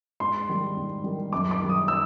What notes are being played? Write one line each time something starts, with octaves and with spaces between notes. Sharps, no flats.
G#2 C6
D#3 G3
G#2
D#3 G3
F#2 D6
D6
D#3 G3
D#6
E6